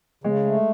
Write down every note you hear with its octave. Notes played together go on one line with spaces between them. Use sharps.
C#3 G#3
A3